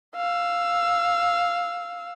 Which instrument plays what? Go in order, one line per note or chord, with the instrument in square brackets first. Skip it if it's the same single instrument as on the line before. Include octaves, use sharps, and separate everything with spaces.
[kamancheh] F5 E6